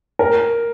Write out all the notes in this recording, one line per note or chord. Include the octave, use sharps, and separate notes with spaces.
A#4